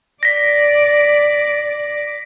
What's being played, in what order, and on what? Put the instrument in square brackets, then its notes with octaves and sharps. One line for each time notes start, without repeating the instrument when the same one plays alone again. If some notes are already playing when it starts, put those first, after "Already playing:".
[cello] D5 [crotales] A#6 B6